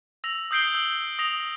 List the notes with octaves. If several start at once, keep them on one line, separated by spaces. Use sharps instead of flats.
E6 A#6 F7
D#6 E6 G6 C7 D7 G7
E6
D#6 A#6 F7